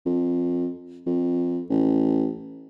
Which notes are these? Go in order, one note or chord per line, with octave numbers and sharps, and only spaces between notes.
F2
F2
A1